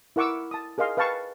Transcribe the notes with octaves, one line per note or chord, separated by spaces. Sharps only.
E4 A#4 F#5 C#6 D6 E6
A5 D#6
G#4 A#4 D#5 F5 C6
B4 F5 G5 A5 C#6